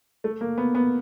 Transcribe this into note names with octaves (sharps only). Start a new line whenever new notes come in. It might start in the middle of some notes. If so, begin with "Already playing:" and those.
A3
A#3
B3
B3